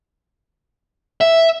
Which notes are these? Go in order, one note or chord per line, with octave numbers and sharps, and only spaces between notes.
E5